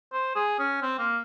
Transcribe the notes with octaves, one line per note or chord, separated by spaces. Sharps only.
C5
G#4
C#4
C4
A#3